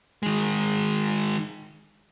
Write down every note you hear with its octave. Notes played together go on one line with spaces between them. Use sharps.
D#3 G#3